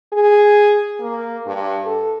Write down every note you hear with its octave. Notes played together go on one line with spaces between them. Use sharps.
G#4
A#3
G2
A4